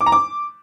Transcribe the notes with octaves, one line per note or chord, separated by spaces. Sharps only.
D6
A#5
D6